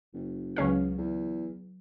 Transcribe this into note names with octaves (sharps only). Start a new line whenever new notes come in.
F#1
C#2 F#3 C#4 G#4 B4 F5
E2